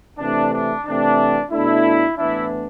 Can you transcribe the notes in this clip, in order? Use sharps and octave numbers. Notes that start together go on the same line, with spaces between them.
C3 E3 A3 C4 D4
D4
C3 E3 A3 C4 D4
B2 A3 D4 E4
A2 E3 B3 D4 E4